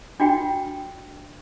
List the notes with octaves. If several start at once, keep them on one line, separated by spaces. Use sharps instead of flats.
D4 F4 F#4 G5